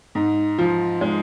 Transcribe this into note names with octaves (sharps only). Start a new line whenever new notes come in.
G#2
F3
G#3